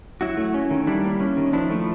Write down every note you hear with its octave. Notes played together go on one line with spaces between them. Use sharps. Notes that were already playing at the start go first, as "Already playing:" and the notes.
F#3 E4 F#4
A3
C#4
D#3
G3 D4 E4
A#3
C#4
D#3
F3 D4 E4
A3